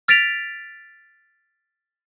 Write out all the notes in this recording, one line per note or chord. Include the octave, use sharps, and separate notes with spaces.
F6 A6 B6 D7 F7